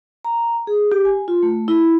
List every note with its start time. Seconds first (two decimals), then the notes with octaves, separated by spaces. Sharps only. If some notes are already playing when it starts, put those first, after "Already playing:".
0.25 A#5
0.67 G#4
0.92 G4
1.05 G#5
1.28 F4
1.43 A3
1.68 E4